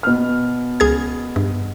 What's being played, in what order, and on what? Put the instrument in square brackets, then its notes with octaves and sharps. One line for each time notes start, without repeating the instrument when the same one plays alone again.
[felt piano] B2 F6
[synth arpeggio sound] C#2 G#4 G#6
G2